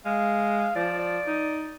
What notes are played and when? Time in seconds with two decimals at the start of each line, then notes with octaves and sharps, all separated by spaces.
0.05 G#3 F5
0.76 F3 D5
0.99 D5
1.27 D#4